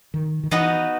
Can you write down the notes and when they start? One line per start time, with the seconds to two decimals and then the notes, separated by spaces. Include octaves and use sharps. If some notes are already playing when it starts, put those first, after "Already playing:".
0.14 D#3
0.44 D#3
0.51 E3 B3 D#4 F#4 B4